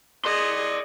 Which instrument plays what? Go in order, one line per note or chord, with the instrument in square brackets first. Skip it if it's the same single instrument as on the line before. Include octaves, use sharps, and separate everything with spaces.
[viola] G#4 D#5 [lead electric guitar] D5 C6